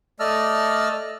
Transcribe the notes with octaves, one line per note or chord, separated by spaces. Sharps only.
A3 D5 D#5 A5 E6 F6